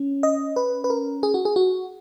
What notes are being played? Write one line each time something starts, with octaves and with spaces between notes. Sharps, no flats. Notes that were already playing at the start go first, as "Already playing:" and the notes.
Already playing: C#4
D#5
B4
B4
A#4
G#4
F#4
G#4
F#4